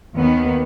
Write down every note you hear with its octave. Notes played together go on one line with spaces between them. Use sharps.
D#2 D#3 B3